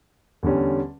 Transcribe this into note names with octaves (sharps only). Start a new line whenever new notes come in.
E2 D3 G3 C#4